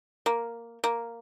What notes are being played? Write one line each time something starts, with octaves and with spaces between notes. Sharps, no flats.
A#3
A#3